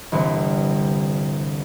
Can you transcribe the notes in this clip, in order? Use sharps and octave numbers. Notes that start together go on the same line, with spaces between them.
G1 C2 D3 E3